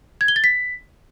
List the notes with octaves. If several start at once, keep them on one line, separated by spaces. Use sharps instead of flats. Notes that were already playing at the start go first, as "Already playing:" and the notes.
G#6
G7
A6
B6